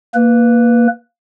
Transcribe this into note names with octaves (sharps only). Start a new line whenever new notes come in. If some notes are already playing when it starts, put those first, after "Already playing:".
A#3 B4